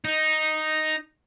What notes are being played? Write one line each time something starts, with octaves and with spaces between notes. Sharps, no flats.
D#4